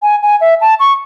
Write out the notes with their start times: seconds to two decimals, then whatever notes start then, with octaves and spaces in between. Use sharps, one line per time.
0.03 G#5
0.22 G#5
0.41 E5
0.61 A5
0.80 C#6